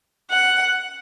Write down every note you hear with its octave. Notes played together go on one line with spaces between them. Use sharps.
F#5